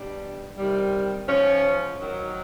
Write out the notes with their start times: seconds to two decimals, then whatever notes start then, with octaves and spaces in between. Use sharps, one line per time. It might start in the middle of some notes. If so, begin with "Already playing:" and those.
Already playing: B2 G3 D4
0.57 C3 D#3 G3
1.27 G#2 F3 C#4
1.98 G#2 D#3 F#3